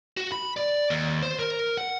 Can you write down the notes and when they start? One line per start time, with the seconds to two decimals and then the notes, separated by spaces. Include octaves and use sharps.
0.17 F#4
0.32 B5
0.57 D5
0.90 D#2
1.23 C5
1.39 A#4
1.77 F#5